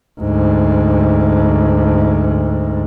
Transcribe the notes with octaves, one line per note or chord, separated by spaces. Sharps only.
D2 G#2